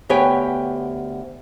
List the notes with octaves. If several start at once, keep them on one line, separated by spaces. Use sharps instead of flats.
D2 B3 G4 C#5 G5 G#5